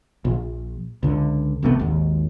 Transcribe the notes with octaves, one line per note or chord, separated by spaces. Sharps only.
A#1
C#2 D3
G#1 C3 A3 B3
G#1 D#2